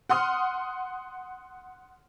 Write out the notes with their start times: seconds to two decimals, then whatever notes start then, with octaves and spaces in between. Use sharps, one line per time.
0.09 F#5 C6 D#6 F6